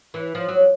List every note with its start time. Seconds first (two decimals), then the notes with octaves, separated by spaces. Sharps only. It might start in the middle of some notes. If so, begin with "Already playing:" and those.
0.14 E3
0.35 F3
0.48 F#3